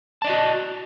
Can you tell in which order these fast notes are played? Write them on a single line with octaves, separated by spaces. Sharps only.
A5 D5 D#5 F#4